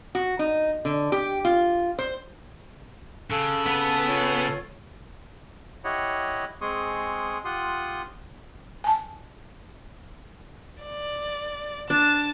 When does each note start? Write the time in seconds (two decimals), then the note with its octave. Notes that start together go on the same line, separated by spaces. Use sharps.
0.15 F#4
0.39 D#4
0.85 D3
1.12 G4
1.45 F4
1.99 C5
3.30 C#3 A4 F5 F#6
3.66 B3 B4 F5 A5
4.06 F4 C#5 C#6
5.84 E4 G4 C#5 D#5 F#5
6.61 G#3 C4 G#4 C6 C#6 D#6
7.45 F4 G4 F#5 C6 D#6
8.84 G#5 A5
10.83 D5
11.90 D4 A6 E7